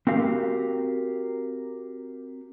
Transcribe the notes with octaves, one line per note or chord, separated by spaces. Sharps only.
C4 F#4 G4 A#4 F5